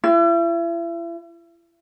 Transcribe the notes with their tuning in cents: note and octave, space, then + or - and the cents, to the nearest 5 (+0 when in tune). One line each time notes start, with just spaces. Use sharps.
E4 +40